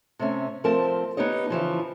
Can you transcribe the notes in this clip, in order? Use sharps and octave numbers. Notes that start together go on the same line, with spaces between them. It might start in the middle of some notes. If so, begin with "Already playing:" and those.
C3 A3 C#4
F3 A3 C4 A#4 A5
B3 D#4 G4 C#5 D#5
C#3 E3 F3